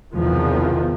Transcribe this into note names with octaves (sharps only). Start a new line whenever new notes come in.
B1 E2 C3 D#3 F3